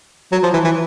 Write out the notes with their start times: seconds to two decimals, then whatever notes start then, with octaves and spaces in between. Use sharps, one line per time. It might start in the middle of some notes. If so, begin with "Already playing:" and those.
0.32 F#3
0.43 F3
0.53 E3
0.64 E3